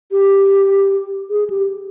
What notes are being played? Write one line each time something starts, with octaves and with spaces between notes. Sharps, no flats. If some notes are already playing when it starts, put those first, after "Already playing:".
G4
G#4
G4